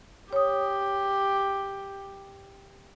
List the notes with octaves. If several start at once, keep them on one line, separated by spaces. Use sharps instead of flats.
G4 C#5 D#6